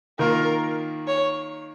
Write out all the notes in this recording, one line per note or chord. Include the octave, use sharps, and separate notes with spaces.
D#3 A#3 F4 A#4
C#5